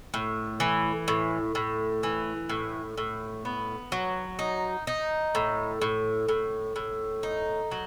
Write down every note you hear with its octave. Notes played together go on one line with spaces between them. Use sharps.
A2
E3
A2
A2
E3
A2
A2
B3
F#3
D#4
D#4
A2
A2
A2
A2
D#4
F#3